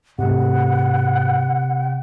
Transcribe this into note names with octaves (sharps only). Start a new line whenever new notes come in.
G#2 C3 A3 F#5